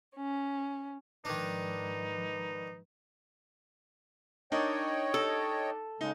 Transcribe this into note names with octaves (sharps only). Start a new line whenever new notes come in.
C#4
G#2 D#3 F3 D4 D#4 B4
D4 D#4 A#4 C#5 D#5 G5
A4
C#3 G#3 D#4